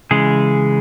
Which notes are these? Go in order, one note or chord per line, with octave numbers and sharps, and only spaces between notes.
C#3 E3 G#3 G#4